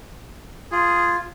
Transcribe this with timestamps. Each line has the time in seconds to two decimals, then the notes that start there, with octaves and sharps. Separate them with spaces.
0.72 F4 G#4